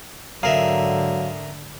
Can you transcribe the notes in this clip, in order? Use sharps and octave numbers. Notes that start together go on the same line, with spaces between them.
G#2 D3 F#3 G#4 A#4 E5 F5 A#5